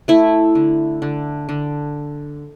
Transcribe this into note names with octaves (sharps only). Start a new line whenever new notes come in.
A3 E4
D3
D3
D3